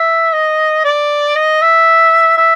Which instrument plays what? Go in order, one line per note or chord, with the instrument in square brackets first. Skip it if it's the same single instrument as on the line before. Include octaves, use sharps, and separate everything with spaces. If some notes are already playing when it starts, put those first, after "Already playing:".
Already playing: [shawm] E5
D#5
D5
D#5
E5
E5